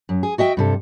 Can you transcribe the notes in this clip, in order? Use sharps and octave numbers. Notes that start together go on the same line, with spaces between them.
F#2
G#4
F#4 D#5 E5 G5
G2 C3 A4